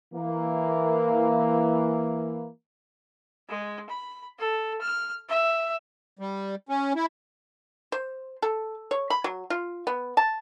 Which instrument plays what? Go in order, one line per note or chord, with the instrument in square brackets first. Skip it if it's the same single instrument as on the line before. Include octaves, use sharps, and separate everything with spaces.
[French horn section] E3 A#3
[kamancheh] G#3
B5
A4
F6
E5
[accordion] G3
C#4
E4
[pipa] C5
A4
C#5
B5
F#3
F4
B3
A5